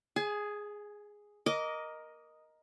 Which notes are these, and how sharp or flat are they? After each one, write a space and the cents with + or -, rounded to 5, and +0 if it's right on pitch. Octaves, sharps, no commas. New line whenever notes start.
G#4 +0 G#5 +40
A#4 +10 D#5 +0 D6 -20